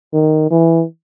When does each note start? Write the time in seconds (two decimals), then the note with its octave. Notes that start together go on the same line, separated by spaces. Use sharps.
0.13 D#3
0.51 E3